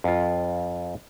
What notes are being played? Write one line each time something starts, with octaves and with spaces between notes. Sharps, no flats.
F2 F4